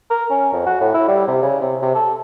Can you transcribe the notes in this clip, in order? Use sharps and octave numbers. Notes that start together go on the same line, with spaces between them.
A#4
C#4
F2
F#4
A2
E4
G3
C3
C#3
C3
C3
A4